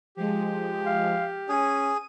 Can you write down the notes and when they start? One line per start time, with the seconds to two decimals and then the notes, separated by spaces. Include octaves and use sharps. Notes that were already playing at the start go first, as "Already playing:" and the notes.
0.17 F3 G#3 G4
0.86 F5
1.49 C#4 G#4 D#7